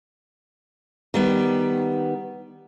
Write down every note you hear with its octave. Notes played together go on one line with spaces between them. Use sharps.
D#3 G3 B3